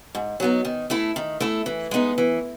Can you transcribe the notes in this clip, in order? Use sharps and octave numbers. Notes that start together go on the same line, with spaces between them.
G#2
F#3 B3 D#4
D#3
A3 E4 A4
D#3
A3 E4 A4
E3
G#3 B3 D#4
E3